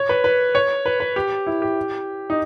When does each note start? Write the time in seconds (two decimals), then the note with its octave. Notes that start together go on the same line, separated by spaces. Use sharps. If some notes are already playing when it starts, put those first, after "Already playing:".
Already playing: C#5
0.09 B4
0.24 B4
0.55 C#5
0.86 B4
1.00 B4
1.16 G4
1.47 E4
1.62 G4
2.30 D#4